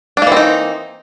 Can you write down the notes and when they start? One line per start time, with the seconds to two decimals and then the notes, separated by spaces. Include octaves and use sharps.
0.17 D4
0.22 A#3
0.27 E3
0.32 C4
0.37 D#4